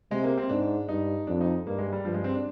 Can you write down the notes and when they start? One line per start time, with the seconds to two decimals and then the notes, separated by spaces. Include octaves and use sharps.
0.11 C3 G#3
0.24 A#3
0.38 C4
0.49 G#2 D4
0.89 G2 D#4
1.27 F2 D4
1.41 D#4
1.66 G2 A#3
1.78 G#3
1.93 G3
2.05 G2 F3
2.14 G#3
2.24 C4
2.34 D4